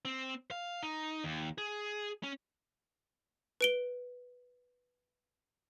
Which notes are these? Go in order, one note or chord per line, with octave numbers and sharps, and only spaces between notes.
C4
F5
D#4
D#2
G#4
C#4
B4 D7 G7